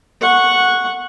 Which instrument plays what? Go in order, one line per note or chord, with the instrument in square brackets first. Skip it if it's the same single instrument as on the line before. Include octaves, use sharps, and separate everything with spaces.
[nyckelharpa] F#5 C#6